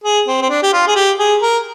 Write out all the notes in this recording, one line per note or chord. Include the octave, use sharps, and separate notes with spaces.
G#4
C4
C4
D4
G4
F4
G#4
G4
G#4
A#4